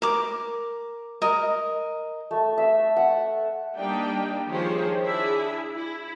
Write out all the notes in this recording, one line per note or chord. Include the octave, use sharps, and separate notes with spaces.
A#4 D6
A#4 D#5
A3
E5
F#5
G3 A#3 D4 D#4 G4 G5
D#3 F3 G4 G#4 C5 C#5
D4 E4 G#4 E5
E4